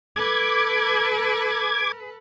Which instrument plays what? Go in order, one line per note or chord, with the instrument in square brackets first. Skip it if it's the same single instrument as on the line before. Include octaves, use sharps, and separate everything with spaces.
[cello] A4 B4 [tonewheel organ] D6 G#6